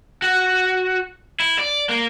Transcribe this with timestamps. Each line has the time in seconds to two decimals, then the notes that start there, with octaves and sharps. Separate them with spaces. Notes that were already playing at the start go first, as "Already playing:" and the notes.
0.22 F#4
1.40 E4
1.59 D5
1.89 A#3